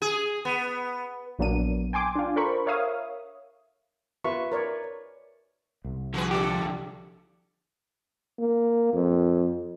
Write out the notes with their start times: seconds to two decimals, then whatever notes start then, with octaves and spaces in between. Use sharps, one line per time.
0.02 G#4
0.45 B3
1.39 A#1 F#3 A#3 B3 D4 D#7
1.93 G5 G#5 C6 D6
2.16 D4 F4
2.36 A4 A#4 C5 B5 C#6
2.66 A#4 C#5 E5 F5 D#6
4.24 F4 B4 E5 C#6
4.52 A#4 C#5 D5
5.85 C2
6.14 D3 F3 F#4 G#4 B4
6.31 G#3 D4 G4 A4
8.39 A#3
8.93 F2